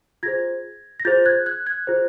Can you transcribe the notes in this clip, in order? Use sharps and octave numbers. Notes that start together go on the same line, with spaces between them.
F4 G#4 C5 G#6 A#6
A#6
F4 G#4 C5 G6 A6
F#6 G#6
F#6 G#6
F#6 G#6
F4 G#4 C5